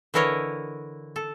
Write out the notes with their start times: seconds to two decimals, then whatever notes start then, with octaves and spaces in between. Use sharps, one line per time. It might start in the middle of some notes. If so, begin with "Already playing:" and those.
0.14 D3 E3 E4 A#4 C#5 D#5
1.16 A4